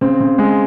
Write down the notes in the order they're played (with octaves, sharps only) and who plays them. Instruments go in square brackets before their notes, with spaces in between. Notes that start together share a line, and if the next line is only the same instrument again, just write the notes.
[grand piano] C#3 C4
C#3
G#3